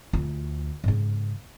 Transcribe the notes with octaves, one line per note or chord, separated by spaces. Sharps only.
D2 F4
G#2 C#3